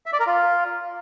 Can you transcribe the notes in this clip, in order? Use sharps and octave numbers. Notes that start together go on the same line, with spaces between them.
E5
D5
A#4
F4